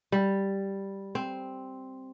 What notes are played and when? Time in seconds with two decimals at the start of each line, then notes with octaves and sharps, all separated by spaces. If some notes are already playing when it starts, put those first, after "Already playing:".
0.12 G3
1.15 C4